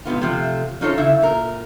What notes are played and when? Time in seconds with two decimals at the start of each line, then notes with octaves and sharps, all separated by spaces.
0.05 G#2 C3 B3 F4
0.21 C3 F3 A3
0.81 C#4 D#4 F4 A4 C5 C#5
0.98 C#3 E4 E5
1.22 A#2 A#4